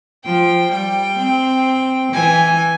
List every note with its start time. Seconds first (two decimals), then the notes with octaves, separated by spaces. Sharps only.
0.25 F3 G5
0.72 G3 G5
1.18 C4
2.13 E3 G#5